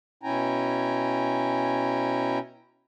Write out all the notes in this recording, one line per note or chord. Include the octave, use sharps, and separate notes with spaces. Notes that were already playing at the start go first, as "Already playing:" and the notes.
B2 C#4 E4 G5 G#5 A#5